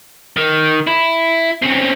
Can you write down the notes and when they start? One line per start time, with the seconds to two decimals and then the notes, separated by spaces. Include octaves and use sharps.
0.37 D#3
0.87 E4
1.62 C4 C#4